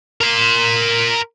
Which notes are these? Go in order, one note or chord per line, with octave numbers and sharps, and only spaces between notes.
A#4 C6